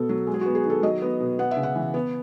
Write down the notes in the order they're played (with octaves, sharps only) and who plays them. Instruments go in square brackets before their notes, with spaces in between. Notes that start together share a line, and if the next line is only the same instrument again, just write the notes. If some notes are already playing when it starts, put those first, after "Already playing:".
Already playing: [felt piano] B2 B3 A4
F#3
G#3
G#4
F#4
B3
G#4
D#3
A4
F#3 D#5
B3
B2
B3 F#5
E5
C#3
F#5
E3
B3